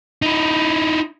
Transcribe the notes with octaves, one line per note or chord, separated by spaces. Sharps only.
D#4 E4